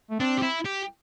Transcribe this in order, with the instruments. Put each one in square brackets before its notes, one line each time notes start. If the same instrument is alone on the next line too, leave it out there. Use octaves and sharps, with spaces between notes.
[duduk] A3
[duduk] C4 [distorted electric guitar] D4
[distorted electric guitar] G4
E4
G4